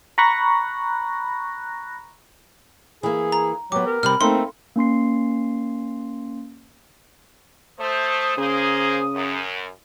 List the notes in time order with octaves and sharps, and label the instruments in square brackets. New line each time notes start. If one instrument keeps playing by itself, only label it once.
[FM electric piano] A#5 B5 C#6 F#6 A#6
[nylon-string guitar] E3 A#3 [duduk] G#4
[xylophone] A#5
[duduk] F#3 [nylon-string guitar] B3 G4 [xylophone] D6
[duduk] A#4
[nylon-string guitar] C3 G3 C4 [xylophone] B5 F6
[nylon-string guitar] A3 A#3 D#4 [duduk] C4 [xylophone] C6
[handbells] A#3 C#4 C6 C7
[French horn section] A3 C5 [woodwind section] D#6
[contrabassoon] C#3 [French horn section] A#3 G#4 C5
[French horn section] F#2